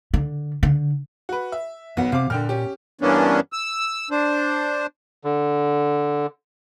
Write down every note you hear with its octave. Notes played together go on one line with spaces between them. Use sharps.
D3
D3
F#4 B4
E5
B1 B3 F#5
C3 F5 D6
A#2 D3 G5 F6
C#4 G4
G2 E3 A#3 B3 C#4 D4
E6
D4 C5
D3